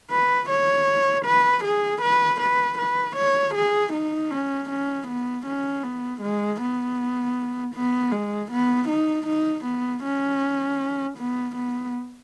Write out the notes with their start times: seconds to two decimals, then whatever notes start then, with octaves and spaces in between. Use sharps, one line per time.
0.11 B4
0.49 C#5
1.25 B4
1.64 G#4
2.02 B4
2.41 B4
2.78 B4
3.16 C#5
3.55 G#4
3.93 D#4
4.31 C#4
4.69 C#4
5.08 B3
5.46 C#4
5.83 B3
6.21 G#3
6.60 B3
7.75 B3
8.12 G#3
8.51 B3
8.88 D#4
9.27 D#4
9.65 B3
10.03 C#4
11.18 B3
11.55 B3